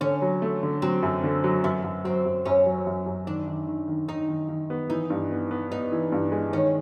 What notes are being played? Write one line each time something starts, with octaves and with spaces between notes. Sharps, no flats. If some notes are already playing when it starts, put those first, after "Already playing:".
D3 C#4
F#3
A3
D3
F#3 C4
F#2
D3
F#3
F#2 B3
F#2
F#3 C4
F#2
F#2 C#4
F#3
F#2
F#2
D#3 D4
D#3
D#3
D#3
D#3 D#4
D#3
D#3
B3
E3 D#4
G2
B3
B3
B3 D#4
E3
G2
G#3
D#3 C#4